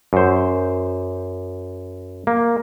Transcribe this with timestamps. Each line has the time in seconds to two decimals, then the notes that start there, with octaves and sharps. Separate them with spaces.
0.13 F#2 C5
2.27 A#3